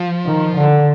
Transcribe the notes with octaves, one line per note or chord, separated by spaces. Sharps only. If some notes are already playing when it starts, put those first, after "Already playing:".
Already playing: F3
D#3
D3